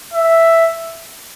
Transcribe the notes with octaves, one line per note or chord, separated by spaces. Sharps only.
E5